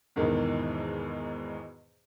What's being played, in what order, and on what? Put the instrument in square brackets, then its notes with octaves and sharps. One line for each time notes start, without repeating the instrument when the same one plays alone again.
[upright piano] E2 G#2 B2 D#3 E3